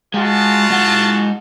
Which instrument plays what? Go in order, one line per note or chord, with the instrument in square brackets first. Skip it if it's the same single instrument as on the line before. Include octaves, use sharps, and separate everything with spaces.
[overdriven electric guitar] G#3 [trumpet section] F4 F#4 A5
[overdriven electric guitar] G#3 F#5